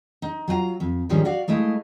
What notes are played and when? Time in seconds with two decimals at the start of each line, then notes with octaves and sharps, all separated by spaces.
0.22 D#4
0.48 F#3 F4 F#5 A#5
0.80 F2
1.09 G#2 D#3 F3 G3 G#3 C#4
1.25 F#4 D5 F5
1.48 G#3 A3 E4 D#5 F5